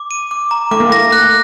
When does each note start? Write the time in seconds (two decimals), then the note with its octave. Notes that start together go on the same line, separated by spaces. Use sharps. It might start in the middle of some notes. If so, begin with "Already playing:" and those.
Already playing: D6
0.11 D#7
0.31 D6
0.51 A#5
0.71 A3 D6
0.80 A#3
0.90 A3 A#6
1.12 F#6